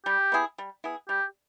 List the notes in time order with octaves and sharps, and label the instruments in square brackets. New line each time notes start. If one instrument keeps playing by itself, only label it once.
[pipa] G3 [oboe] G4
[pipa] B3 E4 G#4
G3
B3 E4 G#4
[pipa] G3 [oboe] G4